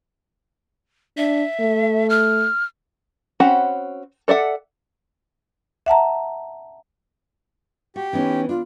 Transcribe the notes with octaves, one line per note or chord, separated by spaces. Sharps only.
D4 E5
A3
F6
C4 C#4 F#4 F#5 B5
A4 D5 E5 F#5
E5 F#5 A5 A#5
F#4 G4
E3 B3 C#4 D#4
D4 F4